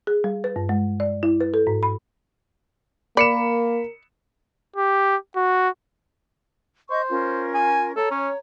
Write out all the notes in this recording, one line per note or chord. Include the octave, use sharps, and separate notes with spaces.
G#4
G3
B4
G2
G#3
D5
E4
B4
A4
G#2
B5
A#3 A#4 D5 B5 C#7 E7
G4
F#4
C5 D#5 C#6 G6
C#4 F4 A#4
G#5
A4 C#5 A#5
C#4